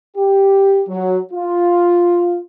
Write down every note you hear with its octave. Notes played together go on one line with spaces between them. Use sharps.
G4
F#3
F4